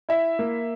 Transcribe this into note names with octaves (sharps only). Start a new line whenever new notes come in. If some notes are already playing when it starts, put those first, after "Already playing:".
E4 E5
A#3